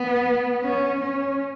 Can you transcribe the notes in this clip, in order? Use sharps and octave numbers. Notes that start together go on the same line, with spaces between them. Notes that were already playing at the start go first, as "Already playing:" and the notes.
Already playing: B3
C#4
C#4